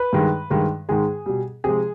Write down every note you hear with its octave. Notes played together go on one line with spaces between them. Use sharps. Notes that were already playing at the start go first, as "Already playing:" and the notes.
Already playing: B4
G2 D#3 G#3
G2 D#3 G#3
G#2 D#3 G#3 G#4
B2 G3
C3 F3 G#3 G#4